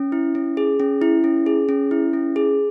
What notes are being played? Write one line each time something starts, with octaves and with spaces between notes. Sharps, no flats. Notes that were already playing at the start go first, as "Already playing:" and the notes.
Already playing: C#4
E4
C#4
G#4
C#4
E4
C#4
G#4
C#4
E4
C#4
G#4